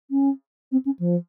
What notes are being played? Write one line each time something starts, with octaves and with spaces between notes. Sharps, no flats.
C#4
C4
C#4
F3